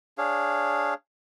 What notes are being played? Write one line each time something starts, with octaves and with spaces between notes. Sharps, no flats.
D4 G#4 C#5 F5